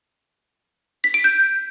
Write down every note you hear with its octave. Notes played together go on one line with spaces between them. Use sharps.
B6
D7
G6